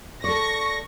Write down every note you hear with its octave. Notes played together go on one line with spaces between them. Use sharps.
A4 D5 C#6 A#6